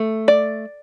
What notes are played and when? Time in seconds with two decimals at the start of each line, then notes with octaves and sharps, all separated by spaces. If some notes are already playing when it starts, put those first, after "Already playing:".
Already playing: A3
0.28 D5